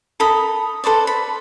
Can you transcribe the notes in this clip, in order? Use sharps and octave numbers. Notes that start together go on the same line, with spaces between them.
A4 A#4 B5 D#6
A4 B4 C5 D5
B5